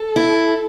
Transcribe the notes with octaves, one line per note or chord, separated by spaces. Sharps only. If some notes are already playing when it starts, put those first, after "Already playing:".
Already playing: A4
E4